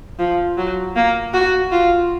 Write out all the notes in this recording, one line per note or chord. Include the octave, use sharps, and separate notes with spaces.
F3
F#3
A#3
F#4
F4